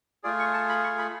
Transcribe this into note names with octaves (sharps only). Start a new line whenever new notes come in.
A3 F4 G#4 D5
C#6
A5
B5
C#6
B5